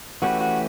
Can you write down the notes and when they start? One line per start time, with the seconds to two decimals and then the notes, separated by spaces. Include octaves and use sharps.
0.22 E3 A3 C#4 F#4 G4 B4
0.40 F#4